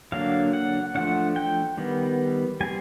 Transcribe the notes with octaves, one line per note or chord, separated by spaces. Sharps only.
D3 F#3 A#3 D4 F5
F#5
F3 A3 D4 F#5
G5
D#3 G3 B3
G3 C4 G#5